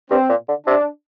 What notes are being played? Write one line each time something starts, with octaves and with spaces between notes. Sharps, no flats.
G2 C4
A#2
D3
C3 D4